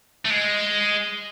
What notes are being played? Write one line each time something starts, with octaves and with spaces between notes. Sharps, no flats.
A3
G#3